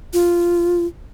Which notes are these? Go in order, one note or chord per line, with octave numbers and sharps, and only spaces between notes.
F4